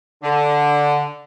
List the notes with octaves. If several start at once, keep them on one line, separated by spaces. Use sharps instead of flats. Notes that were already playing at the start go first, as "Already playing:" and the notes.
D3